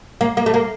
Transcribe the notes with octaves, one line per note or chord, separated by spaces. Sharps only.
A#3
A#3
A3
A#3